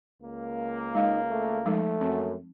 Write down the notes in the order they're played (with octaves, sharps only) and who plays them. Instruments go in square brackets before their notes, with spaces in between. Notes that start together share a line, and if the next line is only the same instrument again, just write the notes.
[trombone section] C#2 A#3
[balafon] G#3 F5 [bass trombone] D#4
[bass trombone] A3
[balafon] F3 G#3 D#4 [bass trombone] A3
[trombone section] F#2 [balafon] C4